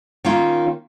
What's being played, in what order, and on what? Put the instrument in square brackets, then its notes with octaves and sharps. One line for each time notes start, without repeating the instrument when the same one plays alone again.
[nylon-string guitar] D#3 A#3 C#4 F4